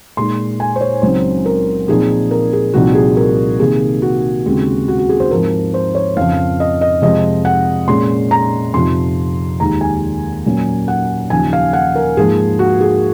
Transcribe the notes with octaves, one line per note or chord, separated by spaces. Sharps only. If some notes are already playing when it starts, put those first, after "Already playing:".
A#2 G#3 D#4 C6
G#5
C5
C#5
C#2 C#3 F#3 C4 D#4 C5
A#4
A#2 F3 C4 D#4 G#4
A#4
G#4
C2 A#2 F3 C4 D#4 F#4
G#4
A#4
C3 D#3 A#3 G#4
F#4
D#2 C#3 G#3 C4
F#4
F#4
G#4
C5
G#2 F3 C4 A#4
C5
C#5
F2 C#3 F3 F5
D#5
D#5
F2 C3 F3 G#3 C4 D#5
F#5
A#2 G#3 C#4 C6
A#5
F2 C3 F3 C4 D#4 C6
D#2 D#3 G#3 A#5
G#5
A#2 F#3 A#3 C#4
F#5
D#2 C#3 F3 G#5
F5
F#5
A#4
G#2 F3 A#3 G#4
F#4
G#4